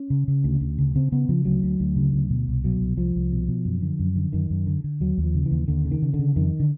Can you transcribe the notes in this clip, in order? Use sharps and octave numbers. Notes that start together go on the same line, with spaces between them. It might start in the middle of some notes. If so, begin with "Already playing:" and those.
Already playing: C#4
C#3
C#3
D2
D2
C#3
C#3 C4
C#3 B3
C#3 F3
D2 F#3
D2
D2
C#3
D2
B2
C2
B2 F#3
C2
C2 F3
C2
B2
B2
F#2
D3
F#2
D3
F#2 D#3
F#2
D3
D3
D#2 F#3
D#2
F3
C#3
E3
D#2
D#2 D3
C#3
D#3
C#3
D3
C#3
F2 D#3
D3